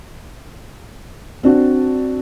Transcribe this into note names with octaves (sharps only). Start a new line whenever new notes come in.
C4 D4 F#4